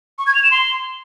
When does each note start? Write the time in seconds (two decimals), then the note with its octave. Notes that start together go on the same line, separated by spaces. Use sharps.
0.19 C#6
0.27 G#6
0.35 F7
0.43 E7
0.51 C6